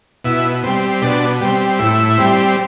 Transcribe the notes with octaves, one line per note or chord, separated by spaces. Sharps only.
B2 E4
G3 C4
B2 D4
G3 C4
A2 E4
G3 C4